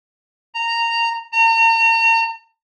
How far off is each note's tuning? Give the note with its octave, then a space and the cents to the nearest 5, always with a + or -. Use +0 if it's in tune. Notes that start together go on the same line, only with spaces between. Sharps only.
A#5 -10
A#5 -40